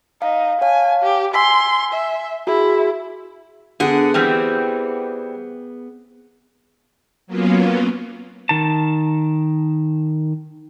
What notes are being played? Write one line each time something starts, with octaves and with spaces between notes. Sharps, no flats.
D#4 F5
C#5 F5 G#5 A5
G4
G#5 C6 E6 B6
E5
E4 F#4 G#4
D3 B3 G#4 F#5
E3 G3 C4
F#3 A#3 B3 C#4 F4
D#3 A5